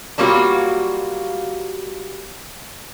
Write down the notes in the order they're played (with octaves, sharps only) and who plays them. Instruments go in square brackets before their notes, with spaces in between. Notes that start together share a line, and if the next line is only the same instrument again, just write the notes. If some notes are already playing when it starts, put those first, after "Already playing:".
[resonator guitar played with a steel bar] F#3 G3 A#3 F4 F#4